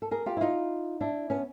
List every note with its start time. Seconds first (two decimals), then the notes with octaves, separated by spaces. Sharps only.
0.02 A4
0.11 G#4 A#4
0.26 F4 G4
0.37 E4
0.41 D#4 F4
1.01 D4 E4
1.30 B3 C#4